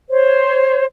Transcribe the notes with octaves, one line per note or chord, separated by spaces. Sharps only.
C5 C#5